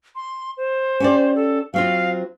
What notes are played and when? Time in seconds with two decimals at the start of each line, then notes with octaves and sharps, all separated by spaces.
0.15 C6
0.57 C5
1.00 C#4 G4 D5
1.36 A4
1.74 F#3 C4 F4 F5